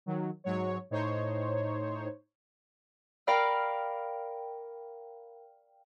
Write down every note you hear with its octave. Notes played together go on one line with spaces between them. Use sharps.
D#3 F#3
G#2 F#3 C#5
A2 D#4 C5 C#5
A#4 D5 F5 G5 B5 F6